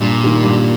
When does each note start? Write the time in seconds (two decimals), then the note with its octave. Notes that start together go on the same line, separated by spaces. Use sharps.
0.01 G2 A#2
0.22 D#3 G3
0.43 G2